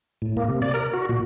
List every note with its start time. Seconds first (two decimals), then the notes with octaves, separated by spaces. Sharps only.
0.22 A2
0.37 A#3
0.48 C3
0.62 D5
0.74 A#4
0.94 F#4
1.09 A#2